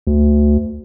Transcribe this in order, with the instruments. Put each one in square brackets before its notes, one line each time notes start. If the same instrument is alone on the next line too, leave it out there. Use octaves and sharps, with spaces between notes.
[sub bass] D2